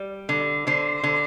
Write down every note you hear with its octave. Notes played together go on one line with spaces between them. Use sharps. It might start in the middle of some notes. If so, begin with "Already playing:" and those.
Already playing: G3
D3
D3 C5
D3